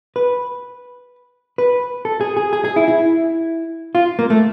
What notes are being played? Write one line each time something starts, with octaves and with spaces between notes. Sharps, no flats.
B4
B4
A4
G#4
G#4
G#4
G#4
E4
E4
F4
A#3
A3